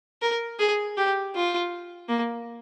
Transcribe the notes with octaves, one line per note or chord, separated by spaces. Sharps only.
A#4
G#4
G4
F4
A#3